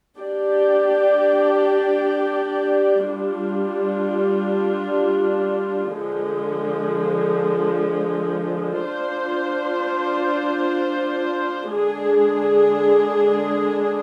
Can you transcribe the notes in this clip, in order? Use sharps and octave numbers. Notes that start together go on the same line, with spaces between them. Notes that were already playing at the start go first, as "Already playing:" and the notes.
D4 G4 D5
G3 D4 F4
D3 F3 G#3
D4 F4 C5
D3 G#3 D4 G#4